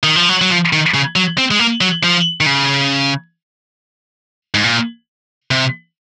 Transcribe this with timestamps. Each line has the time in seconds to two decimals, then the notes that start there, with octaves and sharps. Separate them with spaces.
0.03 D#3
0.16 F3
0.29 F#3
0.41 F#3
0.50 F3
0.73 D#3
0.94 C#3
1.16 F#3
1.38 C4
1.51 G#3
1.59 A#3
1.81 F#3
2.03 F3
2.41 D#3
2.46 C#3
4.54 G#2
4.64 A#2
5.51 C3